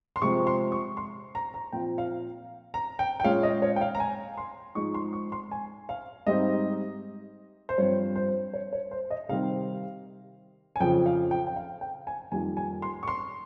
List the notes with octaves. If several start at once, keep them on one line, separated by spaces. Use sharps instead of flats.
C6
C3 F3 G#3 C4 C#6
C6
C#6
C6
A#5
A#5
A#2 F3 C4 F4 G5
F5
A#5
G5
G5
A#2 G#3 C#4 F5
D#5
C#5
G5
F5
A#5
G#5
C6
G#2 F3 G#3 D#4 C#6
C6
C#6
C6
G#5
F5
G#2 G3 C4 D#4 D#5
C5
G2 F3 C4 C#5
C5
C#5
C#5
C5
D#5
C3 D#3 G3 C4 F5
G#5
F2 C#3 F3 G5
F5
G5
G5
F5
G5
G#5
F2 D#3 G3 A#3 F4 G#5
G#5
C6
C#6
C6